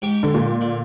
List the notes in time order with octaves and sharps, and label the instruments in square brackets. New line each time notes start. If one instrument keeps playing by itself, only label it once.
[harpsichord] G#2 G4 C#6
[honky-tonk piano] D3
A#2
[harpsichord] D3